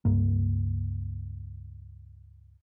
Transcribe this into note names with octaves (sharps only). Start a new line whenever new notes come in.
C#2 G2 A#3